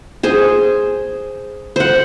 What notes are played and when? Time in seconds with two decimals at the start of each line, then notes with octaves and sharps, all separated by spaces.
0.23 G#4 C5
1.76 C5 F#5